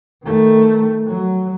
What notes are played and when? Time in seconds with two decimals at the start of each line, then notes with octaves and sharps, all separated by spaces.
0.25 D#3 A3
1.07 F#3